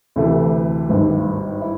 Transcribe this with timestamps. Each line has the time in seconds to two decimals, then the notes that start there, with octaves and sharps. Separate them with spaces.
0.16 D2 C3 E3 A3
0.89 G#1 G2 D#3
1.61 E4